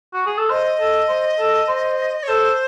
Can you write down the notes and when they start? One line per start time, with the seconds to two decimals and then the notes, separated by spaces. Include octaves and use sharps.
0.14 F#4
0.26 G#4
0.38 A4
0.50 C5 D#5
0.80 A4
1.09 C5
1.39 A4
1.68 C5
2.23 C#5
2.28 A4 C5